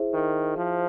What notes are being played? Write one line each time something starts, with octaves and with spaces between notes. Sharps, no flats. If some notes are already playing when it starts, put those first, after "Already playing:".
Already playing: E4 G#4 C5 E5
D#3
F3